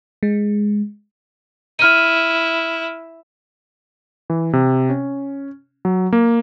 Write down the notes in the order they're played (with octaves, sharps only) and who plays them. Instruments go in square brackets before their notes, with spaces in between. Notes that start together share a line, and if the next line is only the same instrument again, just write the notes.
[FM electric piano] G#3
[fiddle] E4 [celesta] F6 D#7
[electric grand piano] E3
C3
C#4
F#3
A#3